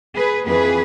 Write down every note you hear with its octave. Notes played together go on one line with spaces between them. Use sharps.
G#4 B4
F2 E3 G#4 B4